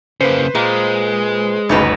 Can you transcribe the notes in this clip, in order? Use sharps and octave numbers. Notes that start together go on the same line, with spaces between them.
C#3 A#3 B4 C5
A#2 G#3
G1 D2 C#3 D#4 B4